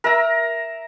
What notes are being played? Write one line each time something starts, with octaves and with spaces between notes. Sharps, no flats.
A#4 E5 A#5